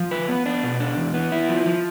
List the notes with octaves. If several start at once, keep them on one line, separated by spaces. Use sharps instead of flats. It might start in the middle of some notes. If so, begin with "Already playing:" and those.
Already playing: F3
B4
B3
D4
B2
D4
E2
B3
E4
F3
F3